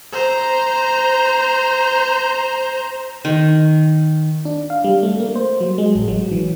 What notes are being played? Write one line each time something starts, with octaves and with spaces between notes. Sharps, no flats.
C5 A#5
D#3
D4
F5
G3
A3
A#3
C5
F#3
G#3
A1
F#3
E3